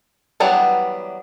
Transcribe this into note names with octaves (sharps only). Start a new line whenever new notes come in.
E3 F#3 G3 B3 D4